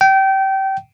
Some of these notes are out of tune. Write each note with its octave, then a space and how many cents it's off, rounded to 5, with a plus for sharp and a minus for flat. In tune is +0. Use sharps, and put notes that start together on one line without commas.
G5 -25